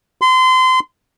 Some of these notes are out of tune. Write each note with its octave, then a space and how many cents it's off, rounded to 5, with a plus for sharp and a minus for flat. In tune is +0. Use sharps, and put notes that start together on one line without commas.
C6 -30